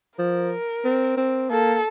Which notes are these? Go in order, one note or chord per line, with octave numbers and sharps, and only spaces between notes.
F3 A#4
C4
C4
A#3 A4